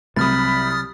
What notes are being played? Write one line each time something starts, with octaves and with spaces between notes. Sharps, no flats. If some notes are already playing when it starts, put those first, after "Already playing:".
C2 C3 F#3 B5 D#6 F6 F#6 A6